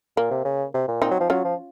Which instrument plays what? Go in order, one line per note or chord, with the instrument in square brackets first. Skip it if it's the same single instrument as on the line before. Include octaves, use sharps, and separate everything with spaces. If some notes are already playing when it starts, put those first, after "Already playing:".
[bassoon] A#2 [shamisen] A#3
[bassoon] C3
C#3
C3
A#2
[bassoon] A#2 [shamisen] C4 D#4
[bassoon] F#3
F3
[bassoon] F#3 [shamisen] C#4 F4
[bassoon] F3